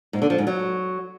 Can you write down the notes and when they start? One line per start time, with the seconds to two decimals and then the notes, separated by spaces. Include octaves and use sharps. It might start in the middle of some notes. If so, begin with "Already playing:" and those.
0.13 G#2
0.22 D3
0.30 F3
0.38 G#2
0.47 F#3